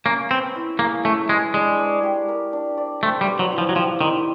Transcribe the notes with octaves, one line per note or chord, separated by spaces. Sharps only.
A#3 C#4
C4 B4
E4
A#3 G#4
A3 C#4
G#3 B4
G#3 D4
D5
G4
A#4
D4
D5
A3 C4
G3
B4
F#3
E4
F3
F#3
F3 G4
D#3 C4